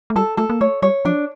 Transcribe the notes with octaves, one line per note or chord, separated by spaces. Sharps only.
A3
G3 A4
A3 A4
A#3
A3 C#5
G3 C#5
F3 D4